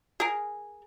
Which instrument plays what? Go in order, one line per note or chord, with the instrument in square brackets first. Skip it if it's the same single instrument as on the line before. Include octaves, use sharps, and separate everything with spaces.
[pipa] G#4 A#4